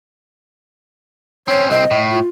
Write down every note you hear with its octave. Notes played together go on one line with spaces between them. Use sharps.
C4 C#4 C#5
C2 C4 D#5
A2
F4